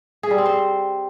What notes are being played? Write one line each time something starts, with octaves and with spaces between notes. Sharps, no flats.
G#4
G3
C4
C5